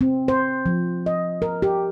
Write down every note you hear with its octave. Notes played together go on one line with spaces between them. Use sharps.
C4
C5
F3
D#5
A#4
G4